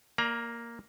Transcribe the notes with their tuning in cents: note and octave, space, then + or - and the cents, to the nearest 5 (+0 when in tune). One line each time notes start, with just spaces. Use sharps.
A#3 +0 D5 +25 A#5 +35